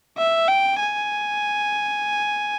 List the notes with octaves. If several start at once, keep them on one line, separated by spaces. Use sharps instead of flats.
E5
G5
G#5